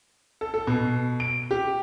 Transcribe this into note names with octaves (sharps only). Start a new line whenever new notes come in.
A4
A4
B2
D7
G4